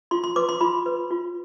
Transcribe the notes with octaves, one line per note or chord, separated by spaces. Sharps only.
F4 C6
C6
B4 D6
C6
F4 B5
B4
F4